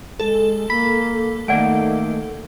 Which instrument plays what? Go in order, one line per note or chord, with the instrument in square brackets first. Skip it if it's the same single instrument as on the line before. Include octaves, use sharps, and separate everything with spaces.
[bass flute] G#3 [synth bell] A4
[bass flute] A#3 [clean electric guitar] B5
[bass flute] D#3 [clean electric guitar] A3 A#3 [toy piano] D5 F#5 G#5